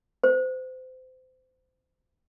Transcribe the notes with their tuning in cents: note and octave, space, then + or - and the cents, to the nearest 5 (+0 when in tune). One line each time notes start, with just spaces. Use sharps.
C5 -30